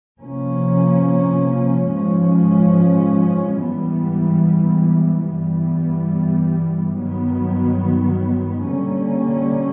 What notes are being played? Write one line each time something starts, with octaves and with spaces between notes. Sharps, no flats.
C3 F3 A#3 C#4
G#2 F3 G#3 C#4
G#2 E3 G3 B3
G2 E3 G3 B3
G2 D#3 F#3 B3
D3 G3 A#3 C#4